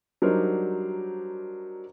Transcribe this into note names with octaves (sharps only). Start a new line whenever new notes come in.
F#3 G3 D4 D#4 A#4 C5